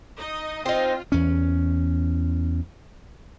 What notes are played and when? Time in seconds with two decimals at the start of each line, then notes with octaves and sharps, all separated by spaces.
0.17 D#4 D#5
0.66 C4 D#4 F4 C5
1.12 E2 C#4